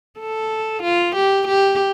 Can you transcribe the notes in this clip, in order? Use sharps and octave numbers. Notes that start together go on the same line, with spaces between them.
A4
F4
G4
G4